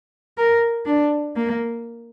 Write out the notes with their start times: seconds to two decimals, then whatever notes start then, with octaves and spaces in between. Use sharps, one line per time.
0.38 A#4
0.86 D4
1.36 A#3